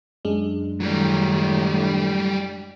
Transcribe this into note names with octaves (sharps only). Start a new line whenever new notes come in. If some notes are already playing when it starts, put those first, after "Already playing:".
F#2 G#3 D4
A2 D#3 F#3 G3